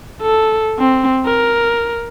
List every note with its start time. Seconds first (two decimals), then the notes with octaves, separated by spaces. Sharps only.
0.22 A4
0.79 C4
1.26 A#4